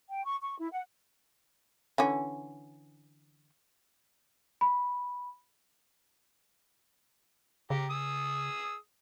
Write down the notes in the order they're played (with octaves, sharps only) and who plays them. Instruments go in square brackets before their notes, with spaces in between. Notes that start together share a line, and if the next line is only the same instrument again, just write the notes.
[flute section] G5
C#6
C#6
E4
F#5
[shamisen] D3 E3 C#4
[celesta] B5
[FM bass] C#3 [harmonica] G4 A#5
[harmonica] G#4 D#6 E6